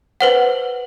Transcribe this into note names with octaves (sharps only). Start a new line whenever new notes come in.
B4 C5 F#5